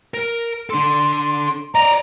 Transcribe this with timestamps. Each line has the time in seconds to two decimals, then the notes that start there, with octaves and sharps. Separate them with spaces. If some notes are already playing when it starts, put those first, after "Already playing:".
0.14 A#4
0.70 D4 A4 C6
1.75 D5 D#5 A#5